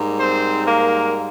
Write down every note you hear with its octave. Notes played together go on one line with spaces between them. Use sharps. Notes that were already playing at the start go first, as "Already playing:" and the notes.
Already playing: G#2 G3 A#3
C4 C5
A#3 A#4